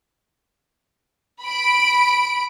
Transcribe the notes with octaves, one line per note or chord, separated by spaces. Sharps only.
B5 D7